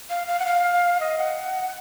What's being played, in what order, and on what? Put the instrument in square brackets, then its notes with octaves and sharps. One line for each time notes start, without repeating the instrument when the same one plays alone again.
[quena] F5
F5
F#5
F5
D#5
F#5